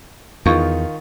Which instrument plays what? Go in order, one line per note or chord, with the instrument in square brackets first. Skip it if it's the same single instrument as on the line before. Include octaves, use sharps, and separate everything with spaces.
[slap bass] E2 [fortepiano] D#3 F4 C#6